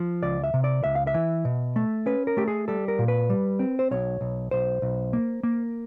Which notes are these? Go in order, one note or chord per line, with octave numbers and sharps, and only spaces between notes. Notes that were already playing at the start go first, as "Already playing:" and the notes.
Already playing: F3
C#2 D5
E5
C3
D5
C#2 E5
F5
E5
E3
B2
A3
C#4 B4
A#4
A3 G4
G#4
G3 A4
A#4
A#2
B4
G3
C4
C5
B1 C#5
B1
B1 C5
B1
A#3
A#3